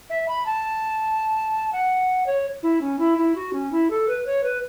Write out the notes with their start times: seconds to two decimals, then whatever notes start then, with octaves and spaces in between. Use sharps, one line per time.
0.10 E5
0.28 B5
0.46 A5
1.73 F#5
2.27 C#5
2.63 E4
2.81 C#4
2.99 E4
3.18 E4
3.35 F#4
3.53 C#4
3.72 E4
3.90 A4
4.08 B4
4.26 C#5
4.43 B4